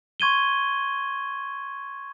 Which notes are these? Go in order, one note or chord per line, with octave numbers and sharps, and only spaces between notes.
C6 C#6 G#6 D#7 G7